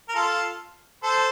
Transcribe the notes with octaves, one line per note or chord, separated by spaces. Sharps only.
A#4
F4 A4
A4 C5